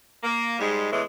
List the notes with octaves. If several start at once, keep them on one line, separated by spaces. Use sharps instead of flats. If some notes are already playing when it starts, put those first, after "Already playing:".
A#3
G#2 G3 G#3
E2 A2 E3 G#3